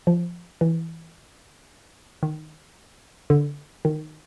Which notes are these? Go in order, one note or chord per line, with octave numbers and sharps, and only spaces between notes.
F3
E3
D#3
D3
D#3